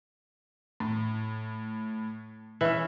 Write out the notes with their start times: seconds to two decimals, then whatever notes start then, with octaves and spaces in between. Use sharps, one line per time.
0.80 A2
2.61 E3 C#4 E5